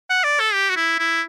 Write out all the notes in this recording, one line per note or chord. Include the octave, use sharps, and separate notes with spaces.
F#5
D5
A4
G4
F#4
E4
E4